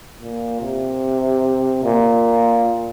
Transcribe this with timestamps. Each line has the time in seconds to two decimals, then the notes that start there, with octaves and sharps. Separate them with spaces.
0.21 A#2
0.61 C3
1.84 A#2